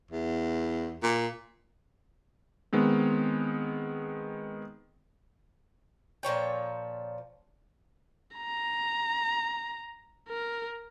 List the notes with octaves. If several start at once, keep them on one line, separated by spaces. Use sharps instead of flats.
E2
A#2
D#3 G#3 B3 C4
A#2 F3 C#5 G5
A#5
A#4